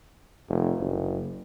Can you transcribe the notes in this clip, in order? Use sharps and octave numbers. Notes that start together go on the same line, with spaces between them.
F1
F#1